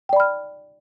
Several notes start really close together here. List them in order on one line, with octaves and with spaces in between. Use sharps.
G5 D5 B5 F6